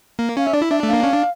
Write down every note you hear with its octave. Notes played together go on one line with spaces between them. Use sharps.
A#3
C#4 F5
E5
D4 D5
E4
D4 E5
A3
A#3 F5
C#4
D4